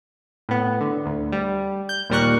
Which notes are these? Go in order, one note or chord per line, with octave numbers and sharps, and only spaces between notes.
A2 B3
D3
D2
G3
G6
D#2 A#2 G3 A#4 C#6 F#6